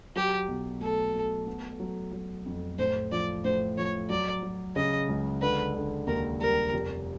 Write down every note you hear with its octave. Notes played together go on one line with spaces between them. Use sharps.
F#3 G4
B1
A3 A4
A3
B3
F#3
F#3
F2
A2 C5
F3 D5
A2 C5
F3 C#5
F#3 D5
F#3
C#3 D#5
C#2
D3 B4
D3
D#2 A#4
G3 A#4
F1